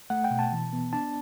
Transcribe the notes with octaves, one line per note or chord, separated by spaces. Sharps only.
A3 F#5
G5
B2
A5
E3
B3
D4 A5